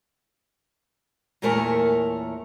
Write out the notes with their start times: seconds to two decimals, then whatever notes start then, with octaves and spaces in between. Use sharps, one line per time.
1.42 E2 A#2 A3 A#4 C#5 A5